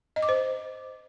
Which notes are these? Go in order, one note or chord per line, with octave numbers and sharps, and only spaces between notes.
D#5
D6
C5